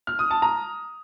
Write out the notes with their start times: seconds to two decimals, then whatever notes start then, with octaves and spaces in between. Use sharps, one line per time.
0.07 F6
0.19 D#6
0.31 A5
0.42 A#5